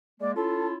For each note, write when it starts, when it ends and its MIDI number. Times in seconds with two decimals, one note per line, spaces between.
0.20 0.35 56
0.20 0.35 58
0.20 0.31 74
0.36 0.76 61
0.36 0.76 64
0.36 0.76 65
0.36 0.67 69